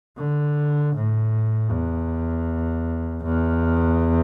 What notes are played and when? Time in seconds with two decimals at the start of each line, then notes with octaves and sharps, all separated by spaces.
0.18 D3
0.95 A2
1.71 E2
3.24 E2